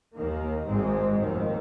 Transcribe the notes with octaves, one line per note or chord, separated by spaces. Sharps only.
D#2 D#3 A#3
G#1 G#2 G#3 C4
F1 D#2 D#3